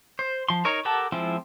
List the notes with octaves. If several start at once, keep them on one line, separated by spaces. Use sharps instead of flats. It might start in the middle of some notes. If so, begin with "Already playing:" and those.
C5
F3 C6
D#4 A#4 C#5
G4 A4 A#4 F#5 A5
F3 G#3 C4 E4 F4